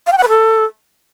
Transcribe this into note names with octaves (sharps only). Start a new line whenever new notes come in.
F5
G5
F#5
B4
A4